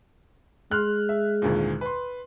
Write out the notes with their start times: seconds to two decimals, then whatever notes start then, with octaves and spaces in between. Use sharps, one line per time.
0.71 G#3 C6 F6 F#6
1.09 E5
1.42 G#1 D2 A#2
1.81 B4 C6